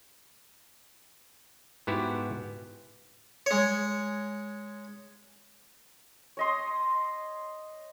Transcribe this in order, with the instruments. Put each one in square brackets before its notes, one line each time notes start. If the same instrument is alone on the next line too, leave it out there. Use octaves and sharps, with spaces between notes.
[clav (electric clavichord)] G#2 B3 E4 F#4 G4
[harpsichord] G#3 C#5
[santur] C#5 D#5 C6